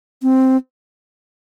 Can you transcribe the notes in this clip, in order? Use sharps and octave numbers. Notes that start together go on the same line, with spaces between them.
C4